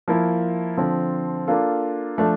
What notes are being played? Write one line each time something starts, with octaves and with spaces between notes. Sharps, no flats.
F3 A#3 E4
D3 F3 C4
A#3 D4 F4 A4
F3 A3 D4 A4